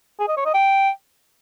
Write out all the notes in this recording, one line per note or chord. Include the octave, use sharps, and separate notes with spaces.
G#4
D#5
C#5
D#5
G5